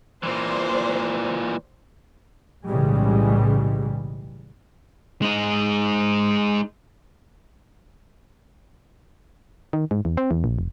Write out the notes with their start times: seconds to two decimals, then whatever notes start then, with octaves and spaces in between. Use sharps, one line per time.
0.23 A#2 E3 C5 D5
2.66 B1 A2 C#3 E3 G3 G#3
5.22 G#3 D#4
9.73 D#3
9.91 G#2
10.05 E2
10.17 C4
10.31 E2
10.44 A#1
10.59 F1